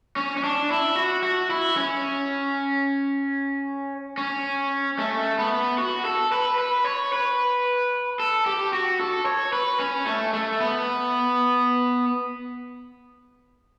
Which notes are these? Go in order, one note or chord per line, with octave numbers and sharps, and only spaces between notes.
C#4
C#4
D4
E4
F#4
F#4
E4
C#4
C#4
A3
B3
F#4
A4
B4
B4
C#5
B4
A4
G4
F#4
A4
C#5
B4
C#4
A3
A3
B3